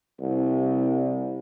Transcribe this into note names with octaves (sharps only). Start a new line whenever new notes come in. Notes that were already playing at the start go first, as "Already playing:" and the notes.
C2